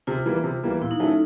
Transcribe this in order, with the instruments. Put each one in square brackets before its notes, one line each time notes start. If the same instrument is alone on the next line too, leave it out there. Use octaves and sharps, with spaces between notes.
[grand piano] C3 [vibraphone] F4
[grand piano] E3 G3 A#3
C3
E3 G3 A#3
[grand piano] A#2 [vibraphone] E4
[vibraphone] D#4
[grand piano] F#3 A3 C#4 [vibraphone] E4
[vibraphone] D#4